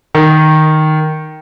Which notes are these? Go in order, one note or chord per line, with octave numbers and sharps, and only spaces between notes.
D#3